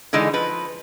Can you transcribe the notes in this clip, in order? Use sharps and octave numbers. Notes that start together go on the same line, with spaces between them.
D3 E3 G#3 D#4
F3 B4